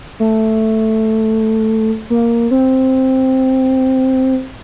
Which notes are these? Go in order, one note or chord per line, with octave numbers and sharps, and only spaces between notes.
A3
A#3
C4